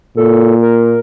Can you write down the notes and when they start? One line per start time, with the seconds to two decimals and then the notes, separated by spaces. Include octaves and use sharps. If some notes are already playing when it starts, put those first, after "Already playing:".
0.17 A#2 A4
0.62 A#4